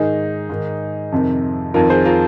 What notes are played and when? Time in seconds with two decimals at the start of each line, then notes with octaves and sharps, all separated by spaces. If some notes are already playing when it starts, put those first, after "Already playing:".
Already playing: G#2 D#3 D#4 G#4
0.50 G#2 D#3
1.12 F2 C3 D#3
1.74 F2 D#3 F4 A#4
1.90 G#4 C5
2.05 F4 A#4